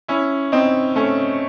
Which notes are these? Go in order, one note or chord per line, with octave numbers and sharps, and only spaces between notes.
C#4 E4
C4 D#4
A3 C#4